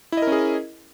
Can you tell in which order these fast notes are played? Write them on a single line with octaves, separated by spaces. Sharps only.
E4 D#5 A#4 C#4 G#4